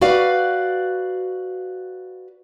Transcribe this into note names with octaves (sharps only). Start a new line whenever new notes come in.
F#4 B4 D5 F5